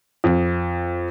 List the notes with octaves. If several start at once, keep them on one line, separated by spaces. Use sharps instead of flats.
F2